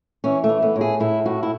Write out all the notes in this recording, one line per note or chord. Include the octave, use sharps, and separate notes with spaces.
E3 C#4
A3
E3
B3
A2
G#4
A2 E4
A2 F#4
E4